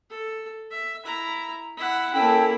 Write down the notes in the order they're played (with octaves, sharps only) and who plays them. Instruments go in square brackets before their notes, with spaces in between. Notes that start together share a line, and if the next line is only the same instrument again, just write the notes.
[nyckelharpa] A4
E5
E4 A#5
E4 F#5
[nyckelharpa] A#3 E4 [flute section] C#4 A4 G5